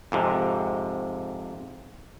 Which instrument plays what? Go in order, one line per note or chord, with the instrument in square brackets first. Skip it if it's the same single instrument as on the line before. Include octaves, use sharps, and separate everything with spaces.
[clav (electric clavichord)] F2 G#2 C3